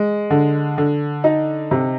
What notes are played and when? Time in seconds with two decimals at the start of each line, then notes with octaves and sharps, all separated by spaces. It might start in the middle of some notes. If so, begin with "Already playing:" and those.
Already playing: G#3
0.30 D3
0.78 D3
1.24 D#4
1.71 C3